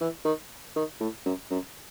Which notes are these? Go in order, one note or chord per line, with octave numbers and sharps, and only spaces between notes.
E3
D#3
D#3
A2
F#2
F#2